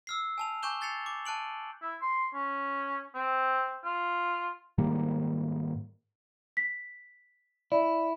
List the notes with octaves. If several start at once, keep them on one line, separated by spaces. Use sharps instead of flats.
E6 F6 C7
G#5 A5 F7
G#5 C#6 D6 G6 E7 G7
G6 A6 C7 C#7 F7
D6
A5 F#6 D7 F#7
E4
C6
C#4
C4
F4
G#2 D#3 G3 A#3
B6
E4 D5